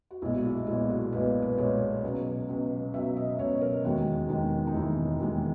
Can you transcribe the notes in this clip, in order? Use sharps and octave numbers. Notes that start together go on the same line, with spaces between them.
F#4
B1 A#2 G#3 E4
F#4
E4
B1 A#2 G#3 E4
F#4
B1 A#2 G#3 B4
B4
B1 A#2 G#3 C#5
C#2 B2 F#3
C#2 B2 F#3
C#2 B2 F#3 E5
D#5
C#2 B2 F#3 C#5
A#4
E1 D#2 D#3 G#3 F#4
E1 D#2 D#3 G#3
D#4
E1 D#2 D#3 G#3 E4
E1 D#2 D#3 G#3